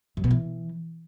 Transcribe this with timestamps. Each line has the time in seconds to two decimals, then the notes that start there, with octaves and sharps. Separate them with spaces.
0.17 F#2
0.24 B2
0.31 E3